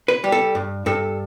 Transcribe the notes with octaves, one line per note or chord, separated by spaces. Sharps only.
B4
G3
A4
G2
G2 A4